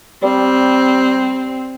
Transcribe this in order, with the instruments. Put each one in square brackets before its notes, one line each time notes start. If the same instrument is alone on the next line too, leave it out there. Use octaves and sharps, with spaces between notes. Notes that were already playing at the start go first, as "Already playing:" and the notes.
[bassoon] G3 [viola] C4